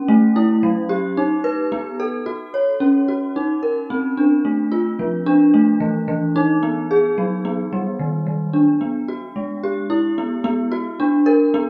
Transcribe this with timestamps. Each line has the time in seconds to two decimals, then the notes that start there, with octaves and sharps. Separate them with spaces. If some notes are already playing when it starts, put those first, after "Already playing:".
Already playing: C#4
0.08 A3
0.36 E4
0.63 F#3
0.89 G4
1.17 D#4
1.44 B4
1.72 B3
2.00 A4
2.26 F#4
2.54 C#5
2.80 C#4
3.08 F#4
3.36 D#4
3.63 A#4
3.90 C4
4.17 D4
4.45 A3
4.72 F4
4.99 F3
5.26 D4
5.54 A3
5.80 E3
6.08 E3
6.36 D#4
6.63 B3
6.91 G#4
7.18 F#3
7.45 B3
7.73 G3
7.99 D#3
8.27 D#3
8.53 D4
8.81 B3
9.08 F#4
9.36 G#3
9.63 G4
9.90 E4
10.18 B3
10.44 B3
10.72 F#4
11.00 D4
11.26 A#4
11.54 B3